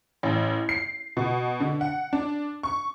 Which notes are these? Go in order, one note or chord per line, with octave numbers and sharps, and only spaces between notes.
A1
C7
B2
D3
F#5
D4
C#6